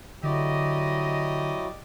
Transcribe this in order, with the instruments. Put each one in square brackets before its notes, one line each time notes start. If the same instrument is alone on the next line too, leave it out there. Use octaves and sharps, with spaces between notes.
[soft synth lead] D3 [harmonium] F#3 E4 F#4 [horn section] G4 D5 D#5